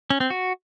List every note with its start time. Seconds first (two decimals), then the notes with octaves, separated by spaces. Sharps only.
0.10 C#4
0.20 C4
0.30 F#4